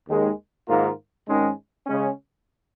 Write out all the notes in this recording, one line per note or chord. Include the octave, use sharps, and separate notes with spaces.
D#2 D#3 G#3
G#2 D#3 A#3 F4 A#4
G#1 G#2 D#3 G#3 C#4
C#3 G#3 C#4